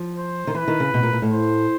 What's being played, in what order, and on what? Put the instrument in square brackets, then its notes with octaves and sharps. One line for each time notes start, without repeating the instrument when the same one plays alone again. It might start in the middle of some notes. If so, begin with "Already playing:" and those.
Already playing: [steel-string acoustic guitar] F3
[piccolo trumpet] C5
[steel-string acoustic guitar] D#3
[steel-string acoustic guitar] E3 [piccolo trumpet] B4
[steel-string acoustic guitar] D#3
C#3
B2
A#2
A#2
A2
[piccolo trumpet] C5